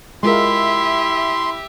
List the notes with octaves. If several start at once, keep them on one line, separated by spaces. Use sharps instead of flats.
G#3 E4 F4 G4 A#4 E5 C6